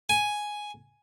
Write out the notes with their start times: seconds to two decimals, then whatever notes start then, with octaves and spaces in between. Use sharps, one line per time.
0.09 G#5